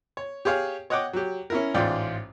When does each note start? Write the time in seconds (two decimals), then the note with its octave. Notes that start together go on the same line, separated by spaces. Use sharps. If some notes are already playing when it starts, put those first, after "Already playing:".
0.17 C#5
0.45 G4 G#4 C#5 F5
0.90 C#5 D#5 F#5 G5 D6
1.13 F#3 G4
1.50 C#4 E4 A#4
1.74 A1 G#2 F4 D5 G5